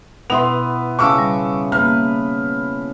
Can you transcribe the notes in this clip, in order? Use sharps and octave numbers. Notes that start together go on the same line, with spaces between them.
B2 B3 E4 C6 F7
C#3 A5 C#6 D6 E6
G3
A#3 B4 F6